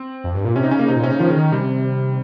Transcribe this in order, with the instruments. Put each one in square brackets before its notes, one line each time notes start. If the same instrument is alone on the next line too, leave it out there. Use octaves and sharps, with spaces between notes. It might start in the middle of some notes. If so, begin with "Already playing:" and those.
Already playing: [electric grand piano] C4
[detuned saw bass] F2
G2
A#2
[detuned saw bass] C3 [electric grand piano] C#4
[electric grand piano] D#4
[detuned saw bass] C#3 [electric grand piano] C#4
[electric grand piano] A#3
[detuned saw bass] C3 [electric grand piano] D#4
[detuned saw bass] A#2
[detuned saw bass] C3 [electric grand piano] C#4
[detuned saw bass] C#3
[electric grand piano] D#3 [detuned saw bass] F3
[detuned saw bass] C#3
D#3
[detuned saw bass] C3 [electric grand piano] G3